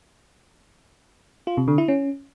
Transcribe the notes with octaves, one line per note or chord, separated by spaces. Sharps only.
F4
C3
D3
E4
C#4